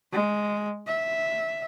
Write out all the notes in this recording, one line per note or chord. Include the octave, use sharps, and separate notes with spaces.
G#3
E5